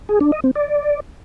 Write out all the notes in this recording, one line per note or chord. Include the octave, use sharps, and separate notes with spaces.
G#4
D4
D#5
C4
D5